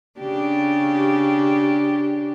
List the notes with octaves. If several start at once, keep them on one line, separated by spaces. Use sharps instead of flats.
C#3 D4 G4